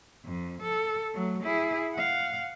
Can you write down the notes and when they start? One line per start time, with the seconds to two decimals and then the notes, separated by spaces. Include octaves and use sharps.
0.25 F2
0.62 A4
1.14 F#3 A3
1.43 E4 G#4
1.94 F5 F#5